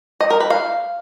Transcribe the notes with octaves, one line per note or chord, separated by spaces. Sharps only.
D#5
A#4
B4
F5